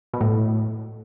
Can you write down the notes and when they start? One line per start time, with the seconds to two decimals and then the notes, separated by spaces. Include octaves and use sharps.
0.13 B2
0.21 A2